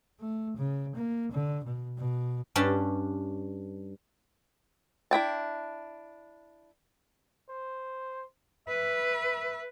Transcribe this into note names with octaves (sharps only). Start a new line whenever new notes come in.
A3
C#3
A#3
D3
B2
B2
G2 C#4 D4 G4 A5
D4 E4 G5 A5
C5
B4 E5